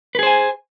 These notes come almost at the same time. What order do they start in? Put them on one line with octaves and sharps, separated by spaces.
B4 G#4 C5 G#5